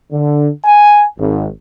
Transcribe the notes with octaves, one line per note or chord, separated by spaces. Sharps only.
D3
G#5
G#1